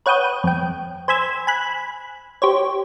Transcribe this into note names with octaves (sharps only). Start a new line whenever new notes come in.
B4 C#5 F#5 G5 D#6 G6
F2 G5
C5 G#5 B5 E6 G#6
G#5 B5 F#6
G4 C5 C#5